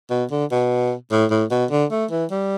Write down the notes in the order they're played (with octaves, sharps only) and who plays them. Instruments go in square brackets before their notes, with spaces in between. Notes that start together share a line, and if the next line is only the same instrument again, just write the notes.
[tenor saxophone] B2
D3
B2
A2
A2
B2
D3
A3
E3
G3